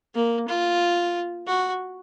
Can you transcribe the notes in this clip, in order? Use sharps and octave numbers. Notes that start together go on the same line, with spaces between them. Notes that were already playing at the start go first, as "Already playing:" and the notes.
A#3
F4
F#4